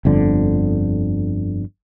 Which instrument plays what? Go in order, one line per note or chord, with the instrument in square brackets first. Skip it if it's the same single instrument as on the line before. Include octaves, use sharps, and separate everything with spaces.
[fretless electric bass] G1 F2 D3